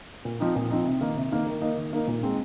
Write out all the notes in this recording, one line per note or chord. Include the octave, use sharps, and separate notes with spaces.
A#2
F3 C4 D#4
A#2
F3 C4 D#4
C3
D#3 A#3 D#4
C3
D#3 A#3 D#4
D#3
A#3 D#4
D#3
A#3 D#4
A#2
G#3 C4 D#4